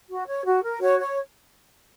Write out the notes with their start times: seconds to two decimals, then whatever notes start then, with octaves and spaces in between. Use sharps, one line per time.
0.08 F#4
0.26 C#5
0.44 F#4
0.62 A#4
0.80 F#4 C#5
0.98 C#5